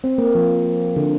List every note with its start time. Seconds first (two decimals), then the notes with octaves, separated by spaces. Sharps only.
0.04 C4
0.18 A#3
0.35 F3
0.96 D3